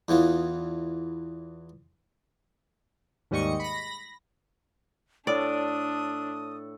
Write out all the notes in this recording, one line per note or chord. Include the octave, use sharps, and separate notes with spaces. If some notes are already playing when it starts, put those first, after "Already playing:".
E2 E3 B3 F4
D#2 G#2 G3 D#5 C#6 C#7
B5 A#6
A2 D4 A4 D5 D#6